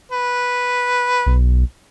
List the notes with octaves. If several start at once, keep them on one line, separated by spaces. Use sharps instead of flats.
B4
B1